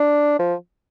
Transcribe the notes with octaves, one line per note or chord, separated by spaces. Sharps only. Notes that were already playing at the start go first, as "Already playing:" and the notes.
Already playing: D4
F3